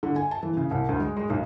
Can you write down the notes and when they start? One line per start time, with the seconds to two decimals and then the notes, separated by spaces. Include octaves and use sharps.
0.03 D3
0.16 G#5
0.31 A5
0.43 E3
0.57 C#3
0.71 C2
0.89 D2
1.00 G#3
1.17 G#3
1.30 B1